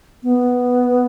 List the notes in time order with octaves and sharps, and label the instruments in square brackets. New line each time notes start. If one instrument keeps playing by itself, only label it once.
[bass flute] B3